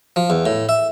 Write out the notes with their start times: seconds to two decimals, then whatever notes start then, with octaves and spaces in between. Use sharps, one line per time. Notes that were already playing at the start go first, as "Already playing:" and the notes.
0.16 F3
0.30 E2
0.46 A2
0.69 E5